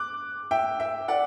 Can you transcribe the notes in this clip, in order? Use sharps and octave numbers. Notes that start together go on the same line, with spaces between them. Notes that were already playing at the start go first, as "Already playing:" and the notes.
Already playing: D6 F#6
E5 G5
E5 G5
D5 F#5